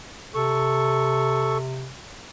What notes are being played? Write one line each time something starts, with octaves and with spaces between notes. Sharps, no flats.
C3 A4 C#6